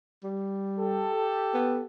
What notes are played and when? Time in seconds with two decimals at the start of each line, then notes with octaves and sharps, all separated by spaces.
0.24 G3
0.79 G4 A4
1.54 B3